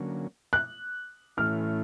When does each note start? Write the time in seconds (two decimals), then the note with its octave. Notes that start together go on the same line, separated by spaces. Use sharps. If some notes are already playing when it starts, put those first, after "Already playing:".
Already playing: D3 F#3 A#3 C#4
0.53 F#6
1.37 A2 E3 A3 C#4 E4 F6